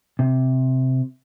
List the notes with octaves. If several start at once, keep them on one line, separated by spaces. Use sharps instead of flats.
C3